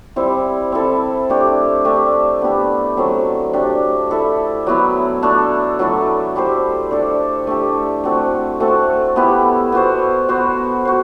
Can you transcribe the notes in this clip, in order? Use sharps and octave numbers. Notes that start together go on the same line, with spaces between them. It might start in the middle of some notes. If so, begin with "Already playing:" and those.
G3 C4 E4
C4 E4 A4
A3 D4 G4
A3 D4 G4
B3 D4 G4
F#3 A3 C4
A3 D4 G4
E4 A4 E5
F#3 B3 E4
A3 D4 A4
F#3 A3 E4 A4
E4 G4 C5
D4 A4 D5
A3 D4 G4
A3 C4 F#4
A3 C4 F#4 A4
B3 E4 G4
B3 F#4 C5
B3 F#4 C5
F#4 C5